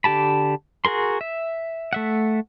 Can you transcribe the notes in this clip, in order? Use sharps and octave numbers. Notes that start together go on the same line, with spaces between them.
D3 G4 A5 B5
F#4 G#4 A#4 C6
E5
A3 E5 F#5